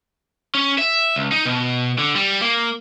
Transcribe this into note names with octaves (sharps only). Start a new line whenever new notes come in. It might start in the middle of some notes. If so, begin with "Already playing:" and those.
C#4
E5
C#2
D#4
B2
D3
G3
A#3